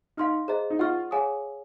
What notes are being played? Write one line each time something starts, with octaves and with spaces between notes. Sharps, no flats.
D#4 F5 C6 F6
G#4 C5 D#5 A#5
D#4
F4 F#5 C#6 F6
G#4 C#5 F5 G#5 D#6